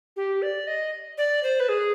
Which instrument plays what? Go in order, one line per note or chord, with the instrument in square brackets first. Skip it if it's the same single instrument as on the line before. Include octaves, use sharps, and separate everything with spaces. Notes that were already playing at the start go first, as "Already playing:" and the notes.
[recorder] G4
D5
D#5
D5
C5
B4
G#4